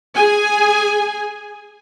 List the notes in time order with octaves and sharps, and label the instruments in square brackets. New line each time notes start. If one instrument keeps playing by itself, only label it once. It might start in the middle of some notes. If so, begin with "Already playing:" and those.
[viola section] G#4 G#5